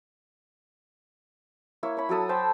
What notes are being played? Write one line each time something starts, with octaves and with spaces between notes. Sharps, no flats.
A#3 E4 C#5
C#5 B5
F#3 F#4 A4 D#6
C5 G5 A5 B5